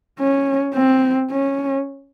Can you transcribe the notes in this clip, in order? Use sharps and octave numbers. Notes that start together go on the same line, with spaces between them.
C#4
C4
C#4